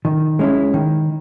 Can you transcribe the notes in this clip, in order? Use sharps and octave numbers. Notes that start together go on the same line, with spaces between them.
D#3
G#3 C#4 E4
D#3